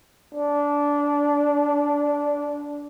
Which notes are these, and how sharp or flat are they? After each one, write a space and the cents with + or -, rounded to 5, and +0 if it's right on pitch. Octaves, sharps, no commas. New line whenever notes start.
D4 -15